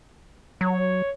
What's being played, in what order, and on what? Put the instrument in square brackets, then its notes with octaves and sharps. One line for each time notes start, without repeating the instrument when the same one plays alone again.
[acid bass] F#3 [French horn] C#5